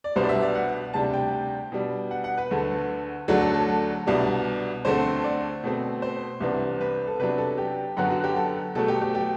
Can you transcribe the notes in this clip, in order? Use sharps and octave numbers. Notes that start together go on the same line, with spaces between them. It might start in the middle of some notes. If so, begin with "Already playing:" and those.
D5
C2 B2 G3 B3 D4 C5
D5
E5
D5
F#5
D2 C3 G3 D4 A5
G5
B2 G3 D4
F#5
F#5
B4
D2 D3 A3
D2 D3 F#3 A3 D4 A4
A4
A4
A4
C2 B2 G3 D4
D2 D3 A3 C4 C5
D5
B2 A3 C4
C5
C2 C3 E3 B3 D4
B4
A4
C3 F#3 B3 D4 B4
A4
G4
F#2 D3 F#3 B3 F#4
F#4
G4
A4
B2 F#3 A3 A4
G4
G4
G4